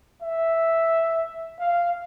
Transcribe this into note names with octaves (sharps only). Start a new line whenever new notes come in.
E5
F5